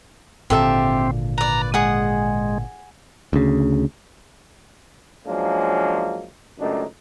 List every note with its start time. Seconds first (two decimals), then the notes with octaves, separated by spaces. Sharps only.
0.50 G#1 A#2 D3 C4 G4 A4 E5
1.38 B4 D5 A#5
1.74 G#3 G#4 F#5 D#6
3.33 D2 C#3
5.27 F3 F#3 G#3 A#3 C#4 D4
6.59 C#2 F#2 A3 D4 D#4